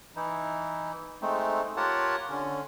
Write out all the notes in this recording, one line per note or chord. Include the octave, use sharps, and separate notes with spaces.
E3 D#4 E4
G#3 A3 C4 D#4
F4 G4 A#4 C#5 F#5 A5
D3 C#4